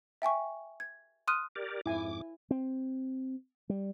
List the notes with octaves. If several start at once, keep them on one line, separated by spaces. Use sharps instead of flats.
E5 G5 G#5 C#6
G#6
C6 D#6 F6 F#6 D#7
G4 A#4 D5
F2 G#2 E4 G#5 D6
C4
G3